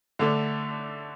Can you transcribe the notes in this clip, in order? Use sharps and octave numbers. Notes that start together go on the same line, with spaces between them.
D3 A3 D4 A4